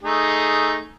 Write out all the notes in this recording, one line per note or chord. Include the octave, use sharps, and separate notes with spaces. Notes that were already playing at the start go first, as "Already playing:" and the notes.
A3 D#4 G#4